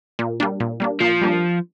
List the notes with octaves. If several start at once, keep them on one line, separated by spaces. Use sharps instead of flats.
A#2
G3 A#3 D4
A#2
G3 A#3 D4
A#2 F3
G3 A#3 D4